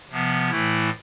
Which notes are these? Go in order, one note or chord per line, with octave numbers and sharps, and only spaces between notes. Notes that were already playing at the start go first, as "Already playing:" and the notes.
C3 F3 B3
A2 E3 A3 E4